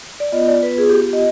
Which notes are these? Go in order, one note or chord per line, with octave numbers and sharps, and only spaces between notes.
D5
B3 F4 D#5
D5
B4
G#4
G4
G4
D#5